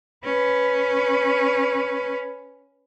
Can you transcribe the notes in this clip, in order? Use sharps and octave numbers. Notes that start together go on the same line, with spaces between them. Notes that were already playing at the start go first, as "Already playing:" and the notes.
C#4 B4